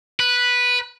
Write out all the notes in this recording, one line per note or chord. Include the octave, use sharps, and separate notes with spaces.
B4